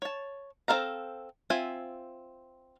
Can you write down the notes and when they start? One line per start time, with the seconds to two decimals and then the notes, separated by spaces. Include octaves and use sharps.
0.02 C#5 A5
0.68 C4 E4 A4 F5 A#5
1.50 C4 F4 E5 G#5